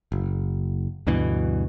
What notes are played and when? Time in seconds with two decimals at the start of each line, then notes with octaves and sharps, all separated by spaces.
0.12 F#1
1.07 D2 G2 B2 E3